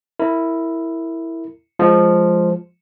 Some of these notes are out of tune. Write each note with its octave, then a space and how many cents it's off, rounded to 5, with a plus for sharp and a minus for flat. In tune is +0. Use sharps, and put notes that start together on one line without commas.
E4 +0 A#4 -25
F3 +0 G#3 +0